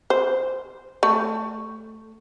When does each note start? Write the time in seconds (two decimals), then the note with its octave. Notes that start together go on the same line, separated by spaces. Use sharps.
0.10 C5
1.03 A3